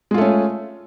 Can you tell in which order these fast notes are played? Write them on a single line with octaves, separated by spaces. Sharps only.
G#3 F4 A3 C#4